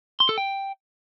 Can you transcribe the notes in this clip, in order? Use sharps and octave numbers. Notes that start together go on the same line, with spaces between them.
C6
A4
G5